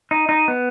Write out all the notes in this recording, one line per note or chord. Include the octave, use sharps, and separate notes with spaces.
D#4
D#4
B3